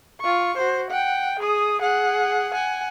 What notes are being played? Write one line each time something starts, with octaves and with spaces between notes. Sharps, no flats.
F4 C#6
F#4 C5
F#5 G5
G#4 D#6
G#4 F#5
F#5 G#5